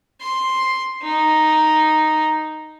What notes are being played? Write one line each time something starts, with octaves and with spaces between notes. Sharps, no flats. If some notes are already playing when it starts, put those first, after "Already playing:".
C6
D#4